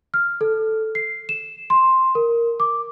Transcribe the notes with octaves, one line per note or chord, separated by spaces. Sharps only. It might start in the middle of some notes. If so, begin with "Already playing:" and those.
F6
A4
C7
E7
C6
A#4
D6